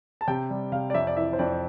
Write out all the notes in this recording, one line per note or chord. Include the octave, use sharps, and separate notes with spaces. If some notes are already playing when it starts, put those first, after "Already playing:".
A5
C3 G5
G3
C3 F5
D5
F2 E5
D5
E3 E5
C5
F2 D5